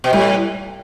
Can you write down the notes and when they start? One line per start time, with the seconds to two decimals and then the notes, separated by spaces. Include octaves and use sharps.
0.04 B2
0.13 A2 G3